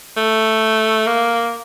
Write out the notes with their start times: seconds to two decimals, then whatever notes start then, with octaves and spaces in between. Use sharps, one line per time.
0.17 A3
1.07 A#3